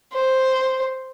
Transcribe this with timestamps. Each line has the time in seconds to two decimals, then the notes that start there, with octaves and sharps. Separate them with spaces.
0.13 C5